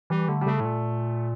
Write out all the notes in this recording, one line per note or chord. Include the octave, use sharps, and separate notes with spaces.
E3 G3
D3 A3
G3
C#3 A3
A2
A#2